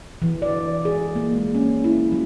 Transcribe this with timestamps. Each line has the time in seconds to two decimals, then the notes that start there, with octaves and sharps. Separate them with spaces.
0.22 E3
0.42 D5
0.85 G#4
1.15 A#3
1.33 G#3
1.55 C#4
1.84 E4
2.12 F#3